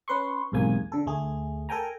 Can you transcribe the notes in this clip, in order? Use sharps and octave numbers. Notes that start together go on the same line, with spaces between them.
C#4 B4 C6 C#6
B1 E2 G#2 C3 A#3 G#5
D3 A4
D2 A3 G#4
A4 A#4 G5 G#5 A#5